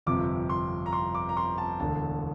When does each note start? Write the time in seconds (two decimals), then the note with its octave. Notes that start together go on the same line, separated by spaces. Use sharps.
0.06 G1 F2 C3 D6
0.49 C6
0.86 A#5
0.93 C6
1.15 D6
1.29 A#5
1.37 C6
1.58 A5
1.80 E1 D2 D3 A5